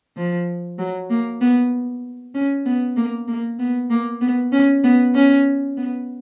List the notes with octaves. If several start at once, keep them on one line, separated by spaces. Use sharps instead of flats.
F3
F#3
A#3
B3
C#4
B3
A#3
A#3
B3
A#3
B3
C#4
B3
C#4
B3